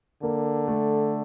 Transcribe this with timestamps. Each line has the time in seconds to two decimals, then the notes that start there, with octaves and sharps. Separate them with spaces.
0.23 D3 A#3
0.68 A3